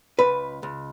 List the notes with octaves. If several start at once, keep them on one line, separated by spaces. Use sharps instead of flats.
C#2 B4
C#2